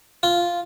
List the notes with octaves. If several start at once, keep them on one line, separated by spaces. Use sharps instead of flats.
F4